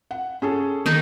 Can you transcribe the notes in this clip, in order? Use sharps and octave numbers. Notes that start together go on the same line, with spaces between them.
F#5
C#4 G#4 A4
D#3 D#4